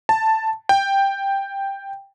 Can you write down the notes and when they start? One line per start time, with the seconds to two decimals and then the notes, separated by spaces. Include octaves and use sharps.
0.09 A5
0.69 G5